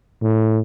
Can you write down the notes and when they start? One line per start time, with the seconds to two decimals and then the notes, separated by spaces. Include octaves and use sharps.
0.22 A2